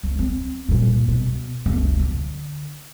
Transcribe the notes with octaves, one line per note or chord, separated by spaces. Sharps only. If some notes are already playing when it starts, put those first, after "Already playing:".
C#2
C4
G2 A#2
B2
F#1 C#2
D3